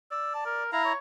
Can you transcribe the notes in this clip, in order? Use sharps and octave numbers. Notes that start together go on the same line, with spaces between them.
D5 E6
A5
A#4
E4 F5 A#5
C#5